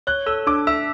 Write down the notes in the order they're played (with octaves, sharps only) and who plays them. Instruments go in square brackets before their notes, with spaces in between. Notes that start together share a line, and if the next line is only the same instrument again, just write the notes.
[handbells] C#5 [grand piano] F#6
[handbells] A4 [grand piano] E6
[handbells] D4 [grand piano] D6
[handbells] E5 [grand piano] E6